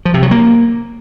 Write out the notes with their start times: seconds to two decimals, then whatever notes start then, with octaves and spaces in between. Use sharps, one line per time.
0.05 F3
0.14 C3
0.23 F#3
0.31 A#3